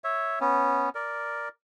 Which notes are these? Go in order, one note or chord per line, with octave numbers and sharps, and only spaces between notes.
C#5 E5
B3 C#4
A#4 D5